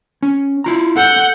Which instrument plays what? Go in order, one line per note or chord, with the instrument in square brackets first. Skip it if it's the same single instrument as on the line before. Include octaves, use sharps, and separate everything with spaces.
[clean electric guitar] C#4
E4 F4 A#5
[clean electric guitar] A4 [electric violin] F#5 G6